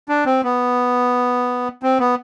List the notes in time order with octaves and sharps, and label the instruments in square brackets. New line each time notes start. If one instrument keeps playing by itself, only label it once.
[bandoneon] D4
C4
B3
C4
B3